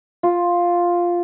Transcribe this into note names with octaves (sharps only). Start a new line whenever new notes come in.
F4